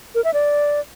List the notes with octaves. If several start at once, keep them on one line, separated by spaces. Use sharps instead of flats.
A#4
E5
D5